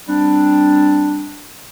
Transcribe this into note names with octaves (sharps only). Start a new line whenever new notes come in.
G3 C4 D4